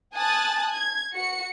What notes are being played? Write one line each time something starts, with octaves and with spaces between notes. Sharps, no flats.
G#5 A5 D#6 F#6 A6
G#6
F#4 C#7